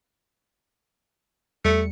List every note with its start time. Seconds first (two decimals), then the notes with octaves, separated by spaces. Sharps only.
1.65 E2 G3 A3 C#7